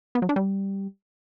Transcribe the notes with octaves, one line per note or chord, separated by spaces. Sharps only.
B3
F#3
D4
G3